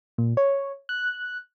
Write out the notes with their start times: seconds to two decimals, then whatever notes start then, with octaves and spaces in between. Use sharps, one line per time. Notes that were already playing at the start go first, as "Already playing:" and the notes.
0.18 A#2
0.37 C#5
0.89 F#6